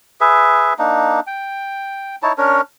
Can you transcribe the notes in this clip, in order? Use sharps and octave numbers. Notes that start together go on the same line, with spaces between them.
G#4 B4 E5
A#3 D4 D#4
G5
D#4 E4 C#5 A5
C#4 D4 A#4 C#5